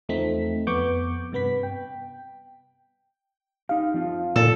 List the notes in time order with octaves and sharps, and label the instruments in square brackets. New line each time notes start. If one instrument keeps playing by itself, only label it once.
[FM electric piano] E2 F3 A3 C4 D#4 B6
F2 B3 C#6 D6 G6
G2 C3 B3 B4 B6
G5
[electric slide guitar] D#4 G4 [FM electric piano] F5
[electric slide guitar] F3 C4 F4
[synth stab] A#2 [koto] A4